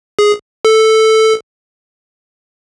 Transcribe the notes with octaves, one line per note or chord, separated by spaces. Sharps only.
G#4
A4